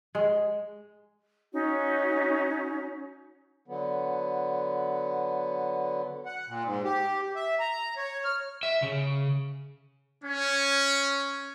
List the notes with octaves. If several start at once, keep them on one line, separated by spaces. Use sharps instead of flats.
G#3
C#4 D#4 F#4 C#5
D3 F#3 B3
F#5
A#2
G#2
G4
E5
A#5
C#5
F6
E5
C#3
C#4